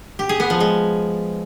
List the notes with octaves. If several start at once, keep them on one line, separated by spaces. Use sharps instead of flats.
G4
G#4
B3
F3
G#3